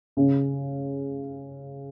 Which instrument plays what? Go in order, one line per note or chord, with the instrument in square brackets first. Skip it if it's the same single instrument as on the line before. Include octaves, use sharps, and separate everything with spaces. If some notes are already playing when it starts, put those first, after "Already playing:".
[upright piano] C#3